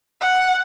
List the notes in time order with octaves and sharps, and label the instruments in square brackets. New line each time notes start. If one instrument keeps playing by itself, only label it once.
[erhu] F#5